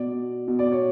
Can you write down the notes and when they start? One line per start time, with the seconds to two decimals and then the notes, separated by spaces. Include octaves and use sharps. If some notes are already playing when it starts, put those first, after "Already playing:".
Already playing: B2 D5
0.48 B2
0.59 D5
0.72 C#5